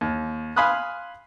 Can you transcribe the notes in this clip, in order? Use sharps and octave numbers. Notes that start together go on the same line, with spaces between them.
D#2
F5 G#5 B5 C6 D#6 F#6